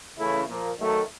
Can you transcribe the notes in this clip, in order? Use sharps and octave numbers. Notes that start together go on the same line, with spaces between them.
C#3 E3 A3 C#4 E4
A#2 F3 A#3
D#3 F#3 A3